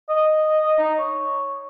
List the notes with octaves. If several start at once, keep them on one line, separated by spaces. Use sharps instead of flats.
D#5
D#4
C#5